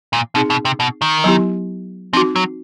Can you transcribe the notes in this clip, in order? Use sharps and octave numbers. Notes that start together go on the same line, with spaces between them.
A#2
B2 C4 D#4 G#4
B2
C3
B2
D#3
F#3 B3 E4 G4
F3 C4 D#4 F#4
F#3